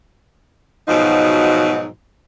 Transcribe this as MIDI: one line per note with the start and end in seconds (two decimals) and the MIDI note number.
0.88 1.87 44
0.88 1.87 47
0.88 1.87 53
0.88 1.87 54
0.88 1.87 63